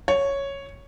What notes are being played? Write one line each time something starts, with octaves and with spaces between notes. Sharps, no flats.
C#5